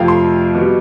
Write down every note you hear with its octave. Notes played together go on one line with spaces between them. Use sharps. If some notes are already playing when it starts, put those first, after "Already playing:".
Already playing: F2 C3 F3 A3 F5 G5
C6
B2 G3